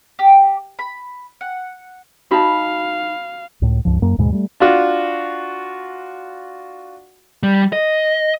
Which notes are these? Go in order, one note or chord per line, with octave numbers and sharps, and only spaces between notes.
G4
B5
F#5
D#4 F#4 F5 A5 B5
C#2 A2
C#2 G2 F3
F#2 A#3
D#2 G#2 B2 G#3
G3 A3
D4 F4 F#4
G3
D#5